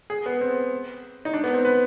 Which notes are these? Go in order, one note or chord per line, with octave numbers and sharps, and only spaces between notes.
G#4
B3
C4
D#4
D4
B3
C4
B4